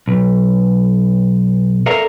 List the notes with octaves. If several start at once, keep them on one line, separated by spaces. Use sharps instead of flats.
B1
A4 A#4 D5 E5 F5 A#5